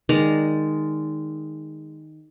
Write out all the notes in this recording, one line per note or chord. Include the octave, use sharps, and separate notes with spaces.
D#3 G#3 D5 A#5